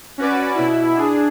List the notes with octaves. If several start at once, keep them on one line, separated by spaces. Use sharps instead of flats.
C#4 F#4 B4 D5
B2 E4
D4 G#4